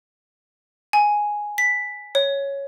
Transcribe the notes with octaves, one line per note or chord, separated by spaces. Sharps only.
G#5
B6
C#5